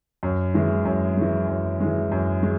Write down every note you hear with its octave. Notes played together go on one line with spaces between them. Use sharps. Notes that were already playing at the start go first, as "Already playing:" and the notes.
F#2
E3 G#3
F#2
E3 G#3
F#2
E3 G#3
F#2
G#3